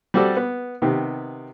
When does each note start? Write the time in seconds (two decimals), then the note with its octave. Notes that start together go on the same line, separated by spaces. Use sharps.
0.14 G3 C4 F#4 A4 D5
0.36 B3
0.82 C3 D#3 B3